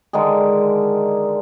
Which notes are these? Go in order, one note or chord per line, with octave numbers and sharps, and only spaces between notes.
D3 D#3 G#3 G#4